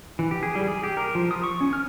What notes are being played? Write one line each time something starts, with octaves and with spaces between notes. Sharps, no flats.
E3
G4
G#4
G3
G#4
G4
A#4
F3
D#6
C#6
C#4
F6